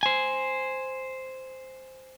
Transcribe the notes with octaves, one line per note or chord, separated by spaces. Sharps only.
C5 G#5